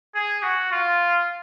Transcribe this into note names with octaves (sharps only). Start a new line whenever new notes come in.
G#4
F#4
F4